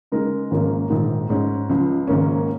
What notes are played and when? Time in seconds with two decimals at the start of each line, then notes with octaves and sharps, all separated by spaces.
0.12 C#3 G#3 D#4 A#4
0.51 G#1 G#2 F3 A#3 C#4
0.90 A#1 G#2 D#3
1.29 G#2 G#3 C#4
1.69 C#2 C#3 F3
2.08 G#1 G#2 D#3 A#3 C#4